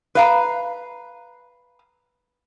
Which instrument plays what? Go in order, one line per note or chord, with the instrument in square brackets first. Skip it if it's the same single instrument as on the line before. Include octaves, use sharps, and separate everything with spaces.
[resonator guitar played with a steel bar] B4 F5 A#5